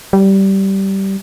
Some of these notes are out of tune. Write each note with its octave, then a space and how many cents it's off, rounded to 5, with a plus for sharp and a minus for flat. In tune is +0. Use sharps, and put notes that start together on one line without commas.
G3 -15